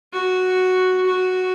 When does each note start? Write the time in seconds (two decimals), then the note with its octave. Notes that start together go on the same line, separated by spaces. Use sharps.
0.13 F#4
1.07 F#4